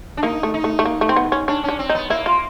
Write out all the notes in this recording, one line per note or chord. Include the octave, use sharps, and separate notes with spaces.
D4
A#3 D#4
A3
D#4
A3
A3
A#3
A3
C4
B3
C#4
C#4 D4
C#4 D4
C4
D#4
B3
A#3 E4
F4